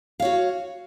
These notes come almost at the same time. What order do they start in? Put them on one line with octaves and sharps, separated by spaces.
F5 C#5 F#4